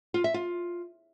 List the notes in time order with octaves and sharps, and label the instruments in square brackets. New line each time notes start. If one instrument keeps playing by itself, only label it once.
[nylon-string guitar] F4
E5
F4